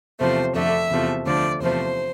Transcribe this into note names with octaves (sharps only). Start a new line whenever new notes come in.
E2 C3 F3 A3 C5
F2 D3 A3 E5
E2 C3 F3 A3
D2 D3 F3 A3 D5
E2 C3 F3 A3 C5